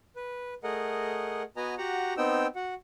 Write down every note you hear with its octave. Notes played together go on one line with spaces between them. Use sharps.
B4
A3 G#4 A#4 D#5 F#5
B3 F#4 B4 D#5 G#5 A#5
F#4 G4 F#5 A#5
B3 C4 D#4 G5 E6
F#4 F#5